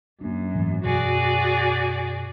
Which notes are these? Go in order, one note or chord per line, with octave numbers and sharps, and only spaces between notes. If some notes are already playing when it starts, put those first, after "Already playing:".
F#2 A#3 D4
G#2 E3 A3
F#2 B2 F#4 G#4 D5